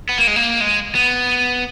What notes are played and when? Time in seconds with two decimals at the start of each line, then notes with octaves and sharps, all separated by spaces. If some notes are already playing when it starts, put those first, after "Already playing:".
0.09 B3
0.18 A#3
0.27 G#3
0.36 A#3
0.61 G#3
0.95 B3